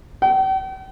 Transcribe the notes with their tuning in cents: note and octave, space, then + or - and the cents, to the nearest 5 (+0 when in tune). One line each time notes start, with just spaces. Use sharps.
G5 -45